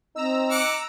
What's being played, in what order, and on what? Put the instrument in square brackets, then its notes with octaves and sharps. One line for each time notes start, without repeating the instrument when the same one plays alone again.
[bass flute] C4 [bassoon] D#4 [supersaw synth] A#5 E6
[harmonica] F#5 D6